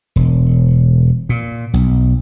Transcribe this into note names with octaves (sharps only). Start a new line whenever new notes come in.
E1
A#2
B1